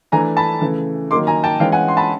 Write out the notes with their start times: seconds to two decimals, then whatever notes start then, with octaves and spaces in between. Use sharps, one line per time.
0.12 E3 A3 D4 G#5 A#5
0.37 A5 B5
0.61 C#3 E3 A3
1.10 D#3 F#3 A#3 D#4 C6 D6
1.27 G#5 A#5
1.43 G5 A5
1.60 E3 G#3 C#4 F5 G5
1.72 F#5 G#5
1.88 C6
1.97 A5 B5